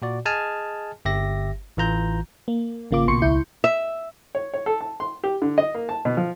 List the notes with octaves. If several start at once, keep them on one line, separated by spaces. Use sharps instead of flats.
A#2 F#4 D5
G#4 D#5 G#5 A5 F6
G1 G4 E5 A#6
A1 E3 F4 A#5 G6
A#3
G#1 C#3 A#3 F4 D6
A#1 B2 A#3 C6 C#6 C#7
C#2 E4 G6
E5
C#5
C#5
A4
A5
C6
G4
D3
D#5
A#3
A5
B2
F3